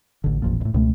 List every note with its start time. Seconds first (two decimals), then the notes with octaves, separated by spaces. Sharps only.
0.24 A1 D3
0.42 A1 F2 A#2
0.61 F2 A2
0.74 C#2 B2 A3